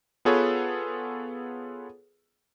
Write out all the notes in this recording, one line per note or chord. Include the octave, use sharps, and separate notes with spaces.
B3 F4 G#4 A4 B4 C#5